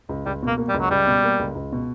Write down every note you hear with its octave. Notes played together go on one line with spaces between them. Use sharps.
C#2
C#2 G3
B2 A#3
A#3
G3
C#2
F#3
C#2 G3
B2
A#3
C#2
C#2
B2